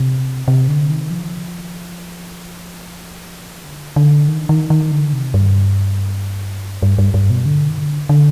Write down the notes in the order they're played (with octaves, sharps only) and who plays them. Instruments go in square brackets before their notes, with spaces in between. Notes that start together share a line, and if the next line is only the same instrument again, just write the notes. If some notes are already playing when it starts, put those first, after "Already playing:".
Already playing: [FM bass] C3
C3
D3
D#3
F3
D3
D3
D#3
D#3
D#3
D3
C3
G2
G2
G2
G2
B2
D3
D#3
D3
D3